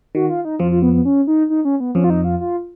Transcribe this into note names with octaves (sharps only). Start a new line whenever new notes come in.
D#3 F#4
F4
D#4
F2 F3 F4
F4
B3
B3
C#4
D#4
D#4
C#4
B3
F2 F3 C#4
F4
D#4
F4
F4